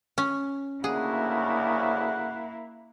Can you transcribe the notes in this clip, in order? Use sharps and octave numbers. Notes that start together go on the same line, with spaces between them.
C#4
D2 C#3 A#3 E4 G#4 F#5